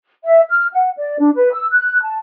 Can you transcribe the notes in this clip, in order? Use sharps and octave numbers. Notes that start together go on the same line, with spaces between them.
E5
F6
F#5
D5
D4
B4
E6
F#6
A5